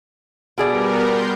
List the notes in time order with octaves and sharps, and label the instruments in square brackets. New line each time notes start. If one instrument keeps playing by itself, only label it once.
[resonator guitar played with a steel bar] B2 G#4 D5 [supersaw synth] G3 B3 A#4
[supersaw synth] C6 G6